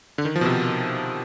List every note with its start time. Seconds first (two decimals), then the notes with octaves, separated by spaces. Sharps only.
0.18 D3
0.25 D#3
0.36 F3
0.41 B2
0.46 C3